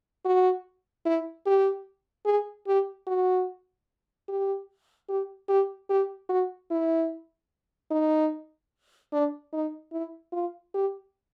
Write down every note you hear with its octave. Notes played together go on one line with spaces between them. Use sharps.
F#4
E4
G4
G#4
G4
F#4
G4
G4
G4
G4
F#4
E4
D#4
D4
D#4
E4
F4
G4